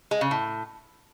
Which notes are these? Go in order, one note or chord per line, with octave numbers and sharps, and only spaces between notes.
G#3
C#3
A2